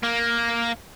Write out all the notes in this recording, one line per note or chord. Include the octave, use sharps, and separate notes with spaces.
A#3